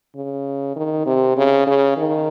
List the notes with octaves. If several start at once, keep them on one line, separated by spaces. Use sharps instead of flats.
C#3
D#3
C3
C#3
C#3
D#3